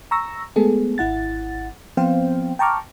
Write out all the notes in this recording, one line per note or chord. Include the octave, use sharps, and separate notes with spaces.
A#5 C#6 E6 A#6
G#3 A3 B3 G#4 A4
G#1 E4 F#5 A6
F3 B3 C4 C5 F5 G5
G5 A5 A#5 C#6 D6 F6